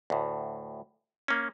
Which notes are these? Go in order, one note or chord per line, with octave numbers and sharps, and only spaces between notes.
D2 A2
A#3 C#4